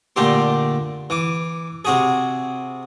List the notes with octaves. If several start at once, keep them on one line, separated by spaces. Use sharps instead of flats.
A#2 D3 A3 G4 C6
E3 D6
C3 F#4 G#4